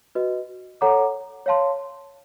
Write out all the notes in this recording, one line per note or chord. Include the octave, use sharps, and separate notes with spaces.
F#4 B4 D#5
A4 C#5 F#5 A#5 D6
C#5 F5 A5 C6